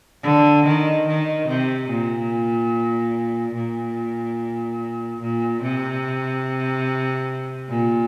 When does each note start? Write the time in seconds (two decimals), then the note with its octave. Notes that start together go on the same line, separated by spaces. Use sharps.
0.23 D3
0.65 D#3
1.07 D#3
1.47 C3
1.90 A#2
3.55 A#2
5.21 A#2
5.62 C3
7.70 A#2